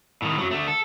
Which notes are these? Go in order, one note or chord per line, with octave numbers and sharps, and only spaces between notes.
A2 D#3
F#2 F#3
D3 A3
A4